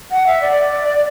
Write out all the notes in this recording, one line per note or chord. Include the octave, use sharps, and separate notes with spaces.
F#5
E5
D5